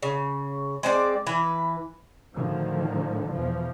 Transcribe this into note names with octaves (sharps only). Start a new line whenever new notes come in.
C#3
G#3 C4 D4 D5
E3 B4
A2 D3 D#3 F3 F#3
E2 B2 E3 F3